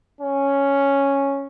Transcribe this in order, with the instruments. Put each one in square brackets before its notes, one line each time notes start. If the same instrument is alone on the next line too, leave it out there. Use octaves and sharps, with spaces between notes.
[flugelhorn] C#4